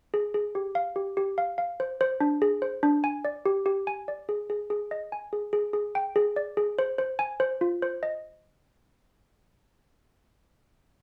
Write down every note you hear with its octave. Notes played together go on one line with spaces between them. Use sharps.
G#4
G#4
G4
F5
G4
G4
F5
F5
C5
C5
D4
G#4
C5
D4
G#5
D5
G4
G4
G#5
D5
G#4
G#4
G#4
D#5
G#5
G#4
G#4
G#4
G5
G#4
D5
G#4
C5
C5
G#5
C5
F4
C5
D#5